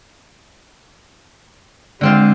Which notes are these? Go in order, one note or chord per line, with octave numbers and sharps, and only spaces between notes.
D3 G#3 C4 F4